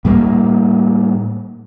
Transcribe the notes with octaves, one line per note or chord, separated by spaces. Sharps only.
A2 G3 G#3 A#3